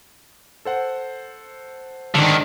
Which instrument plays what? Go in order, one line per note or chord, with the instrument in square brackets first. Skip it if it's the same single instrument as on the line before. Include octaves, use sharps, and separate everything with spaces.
[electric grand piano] A4 C5 F#5
[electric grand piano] G#2 D4 [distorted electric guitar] D3 D#3